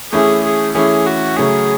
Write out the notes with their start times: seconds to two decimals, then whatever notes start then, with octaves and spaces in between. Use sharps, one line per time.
0.12 E3 A3 C#4 E4 G#4
0.43 G#4
0.74 E3 A3 C#4 E4 G#4
1.06 F#4
1.36 C#3 F#3 A3 C#4 G#4